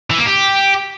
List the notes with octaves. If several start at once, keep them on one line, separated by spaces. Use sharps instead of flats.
E3
A#3
G4